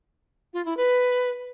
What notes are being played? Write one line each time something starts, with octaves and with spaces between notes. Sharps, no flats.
F4
E4
B4